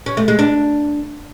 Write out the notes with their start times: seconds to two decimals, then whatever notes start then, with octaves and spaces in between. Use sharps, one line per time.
0.06 C#4
0.17 A3
0.28 G#3
0.39 D4